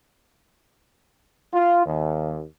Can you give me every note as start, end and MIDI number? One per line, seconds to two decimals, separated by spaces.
1.53 1.83 65
1.86 2.45 39